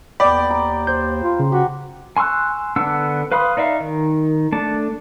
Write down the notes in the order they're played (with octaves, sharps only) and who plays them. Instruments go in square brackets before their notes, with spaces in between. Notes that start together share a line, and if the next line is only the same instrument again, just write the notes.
[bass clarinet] D#2 [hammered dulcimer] B3 G5 [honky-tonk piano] D5 [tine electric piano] B5 D6
[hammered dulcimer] A#5
[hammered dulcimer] C5 [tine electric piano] G6
[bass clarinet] F4
[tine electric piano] C#3
[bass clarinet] F#4 [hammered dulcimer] G4
[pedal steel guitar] G#5 C6 C#6 E6 F#6
D3 B3 D4 F#5 E6
B4 F5 B5 C6 D#6
D#4 D5 E5 F5
D#3
A3 D4 A5